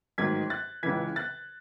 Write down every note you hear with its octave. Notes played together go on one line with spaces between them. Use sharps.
A1 G#2 D#3 F#3 G#6 B6
F#6 A6
C#2 C#3 E3 G#6 B6
F#6 A6